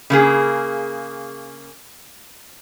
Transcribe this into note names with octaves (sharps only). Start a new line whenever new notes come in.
C#3 A#3 G#4